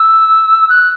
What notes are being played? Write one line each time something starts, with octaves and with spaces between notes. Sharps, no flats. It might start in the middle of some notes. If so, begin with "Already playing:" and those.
Already playing: E6
F#6